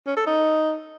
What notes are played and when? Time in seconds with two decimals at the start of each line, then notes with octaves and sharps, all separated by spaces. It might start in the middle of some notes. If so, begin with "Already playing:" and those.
0.07 C#4
0.17 A4
0.27 D#4